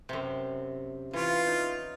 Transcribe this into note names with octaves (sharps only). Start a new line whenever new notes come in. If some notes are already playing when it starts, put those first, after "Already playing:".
F#2 C3
E3 F4 C#5
D#4